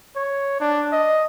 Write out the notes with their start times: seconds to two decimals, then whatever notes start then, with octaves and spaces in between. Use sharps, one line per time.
0.16 C#5
0.60 D4
0.93 D#5